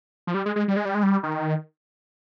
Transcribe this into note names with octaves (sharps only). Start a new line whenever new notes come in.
F3
G3
G#3
G#3
G3
G#3
G3
G#3
G3
D#3